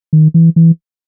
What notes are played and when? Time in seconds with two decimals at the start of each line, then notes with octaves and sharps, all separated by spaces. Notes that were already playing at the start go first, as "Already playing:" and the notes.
0.13 D#3
0.34 E3
0.56 E3